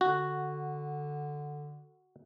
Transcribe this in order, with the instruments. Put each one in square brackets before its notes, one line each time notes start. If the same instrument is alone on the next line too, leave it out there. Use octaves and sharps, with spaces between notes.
[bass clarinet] D3 [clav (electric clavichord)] F#4